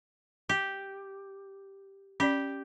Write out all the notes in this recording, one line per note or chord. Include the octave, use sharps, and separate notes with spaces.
G4
C#4 G4 D5